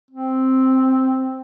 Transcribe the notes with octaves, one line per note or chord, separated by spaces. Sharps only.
C4